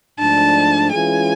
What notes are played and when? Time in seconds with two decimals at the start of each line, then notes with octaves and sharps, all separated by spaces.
0.19 G#2 F3 A3 D4 A5
0.92 E3 G#3 C#4 F4 G#4 G#5